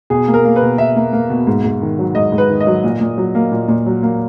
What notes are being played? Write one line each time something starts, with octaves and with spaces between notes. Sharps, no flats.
B2 G#4
A#3
A#4
A#3
B4
B2
B2 E5
A#3
A#3
B2
G#2
G#2
D#3
F#3
G#2 D#5
G#2
B4
D#3
D#5
F#3
A#2
A#2
F#3
A#3
A#2
A#2
F#3
A#3